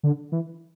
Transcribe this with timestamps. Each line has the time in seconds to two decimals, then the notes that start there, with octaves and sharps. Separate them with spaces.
0.03 D3
0.32 E3